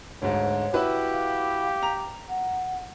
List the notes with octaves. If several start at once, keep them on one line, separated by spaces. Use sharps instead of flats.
D2 G#2 C#5
E4 F#4 G4 B4
F5
A#5 F7
F#5